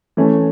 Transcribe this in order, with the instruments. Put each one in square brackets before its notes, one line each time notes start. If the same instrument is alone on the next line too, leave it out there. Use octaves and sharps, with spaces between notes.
[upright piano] E3 A3 C#4